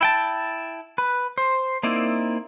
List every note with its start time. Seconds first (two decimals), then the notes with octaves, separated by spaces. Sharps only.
0.01 E4 G5 A5
0.98 B4
1.38 C5
1.83 A#3 C4 D#4 E4 D5